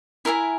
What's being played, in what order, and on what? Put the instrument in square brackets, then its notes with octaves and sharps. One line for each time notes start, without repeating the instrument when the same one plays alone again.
[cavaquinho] E4 A#4 E5 G#5